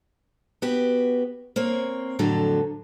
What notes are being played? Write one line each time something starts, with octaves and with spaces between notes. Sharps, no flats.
B3 F#4 G4
A#3 C4 C#5
F2 A2 D3 F#3 A4